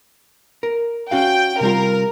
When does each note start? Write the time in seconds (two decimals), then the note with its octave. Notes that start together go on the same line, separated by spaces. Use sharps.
0.63 A#4
1.11 C#4 F#4 F5 G5
1.61 C3 G3 F4 A#4